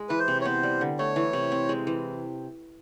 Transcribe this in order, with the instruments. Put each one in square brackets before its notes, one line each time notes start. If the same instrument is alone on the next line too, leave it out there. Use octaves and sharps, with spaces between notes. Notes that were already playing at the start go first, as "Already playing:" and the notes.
Already playing: [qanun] G#3
[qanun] E3 [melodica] B4
[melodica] C5
[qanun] C3
[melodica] C#5
[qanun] B3 [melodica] C5
[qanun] G3
D3
[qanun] A3 [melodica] C#5
[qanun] E3
C3
C4
G#3
E3